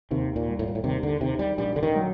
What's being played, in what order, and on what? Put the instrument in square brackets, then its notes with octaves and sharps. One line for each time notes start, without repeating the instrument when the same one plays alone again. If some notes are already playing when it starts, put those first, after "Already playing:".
[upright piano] D#2 [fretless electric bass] C3
[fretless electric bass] A#2
[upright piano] G3
[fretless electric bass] A2
A#2
A2
[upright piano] D#2 [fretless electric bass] C3
[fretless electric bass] D3
[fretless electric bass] C3 [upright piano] D#3
[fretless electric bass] G3
[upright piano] A#1 [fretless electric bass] G3
[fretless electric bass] D3
D#3
[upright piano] F#3